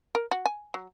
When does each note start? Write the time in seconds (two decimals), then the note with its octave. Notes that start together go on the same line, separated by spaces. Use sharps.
0.15 A#4
0.31 F#4
0.46 G#5
0.74 F#3